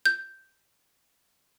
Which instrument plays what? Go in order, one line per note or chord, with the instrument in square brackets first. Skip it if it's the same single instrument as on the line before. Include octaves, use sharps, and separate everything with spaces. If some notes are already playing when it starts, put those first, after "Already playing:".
[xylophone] G6